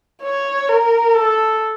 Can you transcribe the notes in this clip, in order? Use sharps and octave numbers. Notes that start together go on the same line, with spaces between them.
C#5
A#4
A4